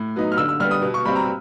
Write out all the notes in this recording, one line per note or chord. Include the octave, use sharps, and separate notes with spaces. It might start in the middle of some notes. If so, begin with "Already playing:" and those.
Already playing: A2
F#3 B3 D#4
F6
D3 E6
E6
G3 B3 F6
D#6
B2
C#6
G3 C4 B5
A#5